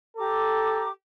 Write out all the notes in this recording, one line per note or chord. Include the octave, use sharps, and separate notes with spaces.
G4 A4 A#5 D6